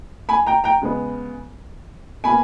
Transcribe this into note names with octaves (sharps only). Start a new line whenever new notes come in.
G#5 B5
G5 A#5
G5 A#5
C#3 G#3 B3
B2 A#3 G#5 B5